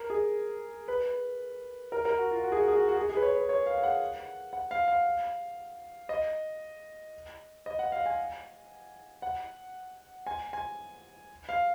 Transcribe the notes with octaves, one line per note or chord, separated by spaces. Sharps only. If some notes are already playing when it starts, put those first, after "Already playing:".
Already playing: A#4
G#4
B4
A#4
A#4
F#4
F4
F#4
G#4
F#4
G#4
F#4
F#4
G#4
G#4
B4
C#5
B4
C#5
F5
F5
F#5
F#5
F5
F5
D#5
D#5
F#5
F5
G#5
F#5
G#5
G#5
F5